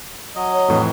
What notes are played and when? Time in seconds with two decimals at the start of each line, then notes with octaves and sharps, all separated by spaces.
0.35 F#3 D#5
0.53 C#5
0.68 F2 A2 E3